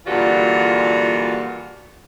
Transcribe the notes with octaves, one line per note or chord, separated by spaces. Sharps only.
A#2 D3 E3 G3 F4 F#4